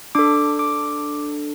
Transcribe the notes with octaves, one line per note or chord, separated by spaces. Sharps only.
D4 A4 D6
D6